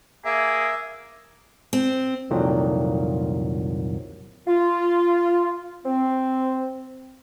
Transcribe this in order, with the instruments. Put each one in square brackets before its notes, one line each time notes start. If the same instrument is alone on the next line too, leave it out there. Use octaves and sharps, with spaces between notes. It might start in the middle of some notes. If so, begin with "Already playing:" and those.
[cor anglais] A#3 [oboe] G#4 [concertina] E5
[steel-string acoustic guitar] C4
[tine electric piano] C2 F2 A#2 D#3 F#3
[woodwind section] F4
C4